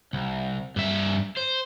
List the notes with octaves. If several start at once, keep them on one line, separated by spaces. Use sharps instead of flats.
C2
G2 E5
C5